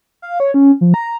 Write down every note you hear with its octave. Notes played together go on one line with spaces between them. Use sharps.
F5
C#5
C#4
F3
A#5